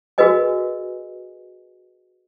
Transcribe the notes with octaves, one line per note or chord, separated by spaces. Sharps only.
F#4 G#4 A#4 B4 D#5 G#5